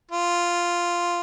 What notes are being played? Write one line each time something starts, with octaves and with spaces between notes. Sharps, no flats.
F4